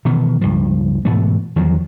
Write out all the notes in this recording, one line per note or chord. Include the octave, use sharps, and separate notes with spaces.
B2 D#3 E3
C#2 G2 F3
G#2 B2 E3 A3
E2 D#3 F3 F#3